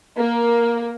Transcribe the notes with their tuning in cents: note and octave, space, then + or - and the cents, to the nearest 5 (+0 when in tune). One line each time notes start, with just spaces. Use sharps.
A#3 +10